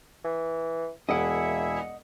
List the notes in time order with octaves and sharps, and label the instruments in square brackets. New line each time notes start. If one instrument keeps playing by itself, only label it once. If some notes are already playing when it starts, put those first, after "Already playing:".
[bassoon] E3
[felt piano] E1 [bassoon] A#3 [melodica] E4 G#4 E5 [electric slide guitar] D#5 F#5